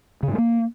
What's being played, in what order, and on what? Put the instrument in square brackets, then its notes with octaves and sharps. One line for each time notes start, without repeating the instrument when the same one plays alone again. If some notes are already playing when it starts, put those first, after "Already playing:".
[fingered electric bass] C#3
G#2
G#3
A#3